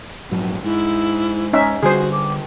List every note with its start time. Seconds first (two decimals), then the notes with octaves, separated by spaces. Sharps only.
0.31 A#1 G#2 F#3
0.64 G#2 E4
1.53 C#4 D#4 E5
1.83 D3 G3 F#4 G#4 C5
2.12 D6